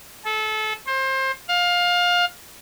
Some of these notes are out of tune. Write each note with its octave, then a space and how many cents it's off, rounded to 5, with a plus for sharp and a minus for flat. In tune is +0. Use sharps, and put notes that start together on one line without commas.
A4 -25
C5 +25
F5 +20